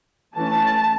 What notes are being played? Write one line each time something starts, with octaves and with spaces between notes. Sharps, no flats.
E3 A3 C#4 A5